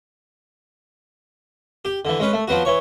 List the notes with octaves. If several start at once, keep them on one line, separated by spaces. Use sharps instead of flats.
G4
D3 E3
G#3 C#4 B4
A3
F3 F#3 B3 F#4
E3 C#5